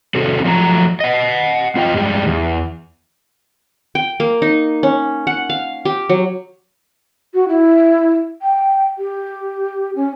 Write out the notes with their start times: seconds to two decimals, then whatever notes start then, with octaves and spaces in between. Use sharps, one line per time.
0.15 C3 C4 F#4 A4
0.44 F3 F#3 A3 G5 A#5
1.00 D#5 F#5
1.76 C4 F4 D#5 G5
1.94 G2 G3 G#3 G4
2.27 E2
3.95 G5
4.20 A#3
4.42 D#4
4.83 C#4
5.27 F#5
5.50 F5
5.85 G4
6.09 F#3
7.34 F#4
7.49 E4
8.42 G5
8.98 G4
9.96 C#4